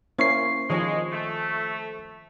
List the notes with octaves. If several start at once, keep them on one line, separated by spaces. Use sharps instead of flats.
A#3 C#4 E4 C5 C#6 C7
D#3 F3 G#3 C#5
A3